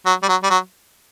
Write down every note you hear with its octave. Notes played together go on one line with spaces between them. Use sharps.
F#3
G3
F#3
G3
F#3